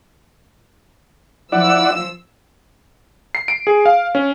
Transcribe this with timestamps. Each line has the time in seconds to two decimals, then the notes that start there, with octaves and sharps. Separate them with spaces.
1.52 F3 E4 D5 F#5 E6
3.35 C7
3.48 D7
3.67 G#4
3.86 F5
4.15 C#4